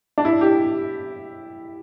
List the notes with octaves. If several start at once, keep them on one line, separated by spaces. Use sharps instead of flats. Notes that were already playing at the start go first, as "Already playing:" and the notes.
D4
E4
G4